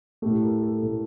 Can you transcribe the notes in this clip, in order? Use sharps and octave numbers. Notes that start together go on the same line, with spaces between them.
A2 A3 G4
A#4
A4
A2 A3